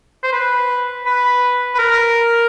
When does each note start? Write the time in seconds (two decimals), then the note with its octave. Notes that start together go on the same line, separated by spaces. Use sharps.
0.24 C5
0.32 B4
1.06 B4
1.75 B4
1.79 A#4